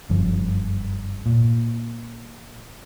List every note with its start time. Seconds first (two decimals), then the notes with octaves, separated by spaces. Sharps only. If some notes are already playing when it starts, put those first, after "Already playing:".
0.10 F#1 G2 F3
1.26 A#2